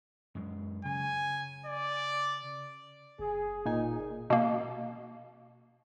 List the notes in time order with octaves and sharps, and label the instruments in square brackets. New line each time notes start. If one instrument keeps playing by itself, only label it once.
[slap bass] F#2 G#3
[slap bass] C#3 [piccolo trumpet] G#5
[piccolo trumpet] D5
[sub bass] F#1 [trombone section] G#4
[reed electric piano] A#2 D#4 G#5
[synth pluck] B2 A#3